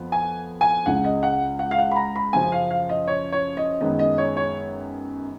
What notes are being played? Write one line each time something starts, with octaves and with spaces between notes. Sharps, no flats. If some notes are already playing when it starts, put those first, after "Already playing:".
Already playing: F2 F3 B3
G#5
G#5
C#2 C#3 G#3 F#5
D#5
F#5
F#5
F5
F#5
B5
A#5
B5
F#2 C#3 F3 G#5
F5
F5
D#5
C#5
C#5
D#5
F#2 D#3 G#3 B3 D#5
D#5
C#5
C#5